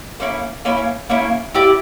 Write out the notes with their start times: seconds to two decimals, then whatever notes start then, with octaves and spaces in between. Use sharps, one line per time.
0.20 A#3 C#4 E4
0.65 A#3 C#4 E4
1.10 A#3 C#4 E4
1.54 E4 G4 D5